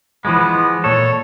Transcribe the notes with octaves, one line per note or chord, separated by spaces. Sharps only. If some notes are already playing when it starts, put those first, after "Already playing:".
E3 F3 G#3 B3
A#2 A4 C#5